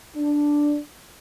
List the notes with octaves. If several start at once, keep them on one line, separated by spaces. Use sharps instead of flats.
D4